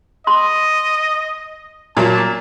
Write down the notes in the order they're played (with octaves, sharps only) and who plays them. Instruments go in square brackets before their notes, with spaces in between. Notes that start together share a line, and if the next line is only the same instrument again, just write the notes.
[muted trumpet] D#5 [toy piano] C6
[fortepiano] A#2 F#3 A#3 [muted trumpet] A5